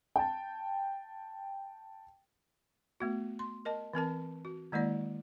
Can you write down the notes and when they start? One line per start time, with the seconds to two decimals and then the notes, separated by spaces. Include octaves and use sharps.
0.16 G5 A5
3.00 A3 B3 F#4
3.39 C6
3.65 A#4 D#5 A5
3.93 E3 C4 A#4 A5
4.45 F#4
4.72 D#3 G#3 A#3 E4 D5